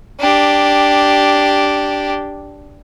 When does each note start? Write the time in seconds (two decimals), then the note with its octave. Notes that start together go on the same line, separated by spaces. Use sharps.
0.20 D4 G4